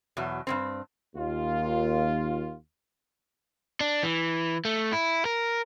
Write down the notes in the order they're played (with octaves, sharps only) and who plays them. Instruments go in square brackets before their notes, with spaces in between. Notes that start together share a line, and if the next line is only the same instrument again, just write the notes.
[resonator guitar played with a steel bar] E2 B2 F#3
G2 A#2 C4
[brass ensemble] D#2 F4
[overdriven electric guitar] D4
E3
A3
E4
A#4